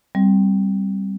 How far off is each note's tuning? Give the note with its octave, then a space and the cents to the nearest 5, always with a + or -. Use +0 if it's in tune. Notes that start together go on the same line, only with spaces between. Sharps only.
G3 +0 C4 +0